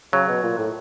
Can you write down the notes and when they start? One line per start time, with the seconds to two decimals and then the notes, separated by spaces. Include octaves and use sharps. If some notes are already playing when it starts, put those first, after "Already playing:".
0.13 C#3 F#3
0.28 B2
0.43 A#2
0.58 A2